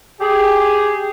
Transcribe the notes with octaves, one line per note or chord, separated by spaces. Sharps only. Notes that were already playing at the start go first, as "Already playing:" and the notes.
G4 G#4